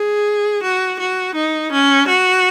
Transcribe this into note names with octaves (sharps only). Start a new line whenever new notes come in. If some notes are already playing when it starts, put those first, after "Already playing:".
Already playing: G#4
F#4
F#4
D#4
C#4
F#4